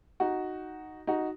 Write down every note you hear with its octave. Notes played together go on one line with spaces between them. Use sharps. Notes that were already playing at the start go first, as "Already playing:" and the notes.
D#4 F#4
D#4 F#4